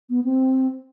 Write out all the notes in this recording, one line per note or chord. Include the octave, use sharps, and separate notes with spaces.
B3
C4